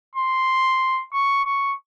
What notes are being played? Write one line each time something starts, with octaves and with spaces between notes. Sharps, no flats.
C6
C#6
C#6